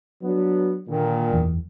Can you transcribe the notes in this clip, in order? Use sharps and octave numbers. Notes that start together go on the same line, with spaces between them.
F#3 B3 D4
A#2 D3 D#3
F#1 E2